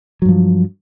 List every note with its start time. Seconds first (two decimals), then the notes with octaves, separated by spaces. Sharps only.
0.22 F#3
0.25 G2
0.29 F3